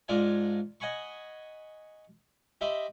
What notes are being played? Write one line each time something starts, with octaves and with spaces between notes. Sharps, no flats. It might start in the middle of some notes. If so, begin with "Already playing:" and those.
G#2 D4 F4 A#4 F5 G#5
D#5 F#5 G#5 B5 C#6
G4 D#5 E5 B5 C6